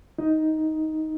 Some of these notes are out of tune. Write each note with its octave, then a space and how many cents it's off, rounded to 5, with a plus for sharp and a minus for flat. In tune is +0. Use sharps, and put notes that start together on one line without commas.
D#4 +10